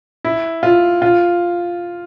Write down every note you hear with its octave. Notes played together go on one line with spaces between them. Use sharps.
E4
F4
F4